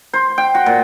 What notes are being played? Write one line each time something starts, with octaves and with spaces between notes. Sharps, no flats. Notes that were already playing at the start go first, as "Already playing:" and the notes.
C5
G5
F#4
A#2